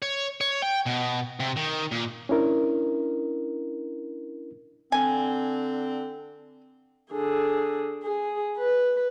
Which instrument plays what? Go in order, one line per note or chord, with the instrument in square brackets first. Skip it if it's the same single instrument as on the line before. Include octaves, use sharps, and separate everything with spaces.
[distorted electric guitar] C#5
C#5
G5
B2
C3
D#3
A#2
[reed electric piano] C#4 D4 E4 A#4
[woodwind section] D3 C4 [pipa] G#5
[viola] D3 G#4
G#4
B4